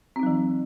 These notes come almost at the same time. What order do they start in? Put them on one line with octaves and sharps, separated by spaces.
C4 D#4 F#3 E3